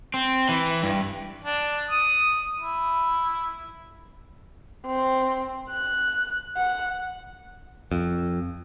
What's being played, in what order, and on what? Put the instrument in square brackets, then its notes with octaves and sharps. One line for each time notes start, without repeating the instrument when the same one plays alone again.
[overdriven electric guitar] C4
E3
G2
[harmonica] D4
D#6
E4
[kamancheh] C4
F#6
F#5
[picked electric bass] F2